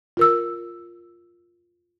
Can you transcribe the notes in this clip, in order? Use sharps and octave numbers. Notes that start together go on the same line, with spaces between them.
F4 A#4 E6